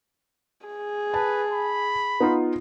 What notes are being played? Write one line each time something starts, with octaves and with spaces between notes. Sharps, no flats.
G#4
B4 A5
B5
B3 D#4 F4